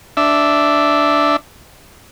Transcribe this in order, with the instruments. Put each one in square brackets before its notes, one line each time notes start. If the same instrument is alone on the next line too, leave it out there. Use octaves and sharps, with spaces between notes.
[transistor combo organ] D4 E5